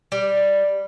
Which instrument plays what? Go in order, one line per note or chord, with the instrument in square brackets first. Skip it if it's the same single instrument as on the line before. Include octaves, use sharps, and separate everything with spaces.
[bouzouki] G3